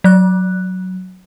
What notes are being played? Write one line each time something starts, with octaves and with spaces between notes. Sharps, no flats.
F#3 F#6